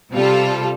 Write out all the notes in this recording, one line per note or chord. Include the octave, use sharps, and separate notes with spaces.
C3 G3 F4 A4